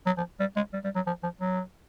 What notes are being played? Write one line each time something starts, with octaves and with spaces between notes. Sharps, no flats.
F#3
F3
G3
G#3
G3
G3
F#3
F3
F3
F#3